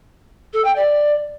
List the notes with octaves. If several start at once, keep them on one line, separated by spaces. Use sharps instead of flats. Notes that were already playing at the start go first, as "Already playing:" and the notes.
A4
G5
D5